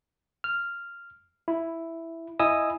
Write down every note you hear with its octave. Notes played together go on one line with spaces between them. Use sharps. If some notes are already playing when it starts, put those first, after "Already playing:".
F6
E4
E4 D#5 G#5 D#6 E6